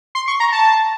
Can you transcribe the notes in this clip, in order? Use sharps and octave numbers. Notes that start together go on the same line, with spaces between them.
C6
C#6
A#5
A5